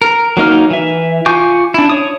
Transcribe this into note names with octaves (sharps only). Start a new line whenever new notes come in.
A#4
F#3 A#3 D#4 F6
E3 E5
F4 G#5 C#6 D6 G6
D4 E4
C#5 D#6